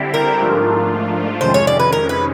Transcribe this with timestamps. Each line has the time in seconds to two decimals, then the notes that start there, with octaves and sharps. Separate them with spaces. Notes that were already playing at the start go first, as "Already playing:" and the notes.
Already playing: D3 G3 C4 E4 G4
0.14 A#4
0.40 G#2 F3 A3 D4 F4
1.41 F2 C3 D#3 G#3 C#4 C5
1.54 C#5
1.67 D5
1.79 B4
1.93 A#4
2.09 B4